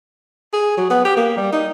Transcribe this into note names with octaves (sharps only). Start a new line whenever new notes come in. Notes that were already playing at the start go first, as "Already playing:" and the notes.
G#4
F#3
B3
G4
A#3
G3
D#4